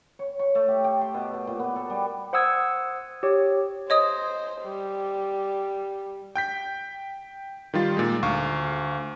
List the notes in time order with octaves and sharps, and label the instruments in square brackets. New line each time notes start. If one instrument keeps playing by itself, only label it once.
[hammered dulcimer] C#5
C#6
A3
G4
G4
C6
B2
B2
A#2
B3
A4
G3
[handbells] C5 F#5 D#6 E6 G#6
G4 C#5
[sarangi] C5 [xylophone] C#5 D#5 D#6
[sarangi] G3
[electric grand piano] G5 G6 B6
D#3 G3 F4 A6
A#2 G#3
D2 F5 C#6